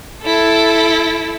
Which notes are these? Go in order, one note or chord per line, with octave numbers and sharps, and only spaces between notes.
E4 A4